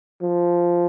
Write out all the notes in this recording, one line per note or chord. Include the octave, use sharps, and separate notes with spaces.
F3